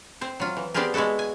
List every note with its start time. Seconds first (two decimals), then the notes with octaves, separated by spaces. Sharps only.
0.21 C4 C5
0.40 F#3 F4
0.57 E3
0.74 B3 C4 D4 G4 G#4 A#4
0.94 G#3 B3 E4 F#4 A4
1.19 G#5